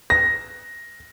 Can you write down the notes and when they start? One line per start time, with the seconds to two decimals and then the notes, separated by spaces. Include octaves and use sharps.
0.10 A#6